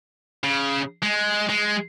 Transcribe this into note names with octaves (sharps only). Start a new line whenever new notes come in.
C#3
G#3
G#3